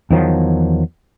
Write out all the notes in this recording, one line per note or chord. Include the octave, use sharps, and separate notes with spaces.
E2 D#3 F3 F#3